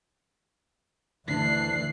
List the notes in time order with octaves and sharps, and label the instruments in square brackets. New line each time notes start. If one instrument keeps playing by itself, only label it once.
[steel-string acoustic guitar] D2 D4 [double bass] D3 E3 [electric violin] F#6 C7